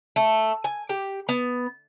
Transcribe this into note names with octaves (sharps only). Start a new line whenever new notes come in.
A3
G#5
G4
B3